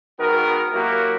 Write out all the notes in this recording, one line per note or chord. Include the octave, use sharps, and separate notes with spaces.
G#2 D#3 B3 F#4 A#4
F#3 A#3 E4 F#4 G4 A#4